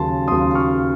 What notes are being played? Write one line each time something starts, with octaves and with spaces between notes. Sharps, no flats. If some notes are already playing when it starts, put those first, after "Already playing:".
Already playing: D#2 C#3 F#3 A5 C6
D#2 C#3 F#3 C6 D#6
C#6 F6